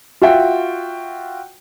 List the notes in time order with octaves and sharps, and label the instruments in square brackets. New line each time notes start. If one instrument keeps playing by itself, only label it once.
[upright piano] F4 F#4 E5 G5